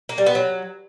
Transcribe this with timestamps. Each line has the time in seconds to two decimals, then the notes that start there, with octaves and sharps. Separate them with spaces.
0.09 A#3
0.18 G3
0.26 B3
0.35 F#3